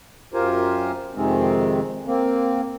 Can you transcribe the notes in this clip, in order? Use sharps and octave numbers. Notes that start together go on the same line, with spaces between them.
F#2 F4 G4 A#4 C5 G#5
F2 C3 D#3 G#3 C4
A#3 C4